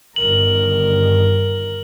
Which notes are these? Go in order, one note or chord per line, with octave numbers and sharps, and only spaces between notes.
G1 D#3 A#4 F#7